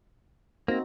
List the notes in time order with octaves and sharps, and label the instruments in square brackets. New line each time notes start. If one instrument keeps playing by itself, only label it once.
[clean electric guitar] A#3 [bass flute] C4 [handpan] D#4 F#4 [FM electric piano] C5 A#6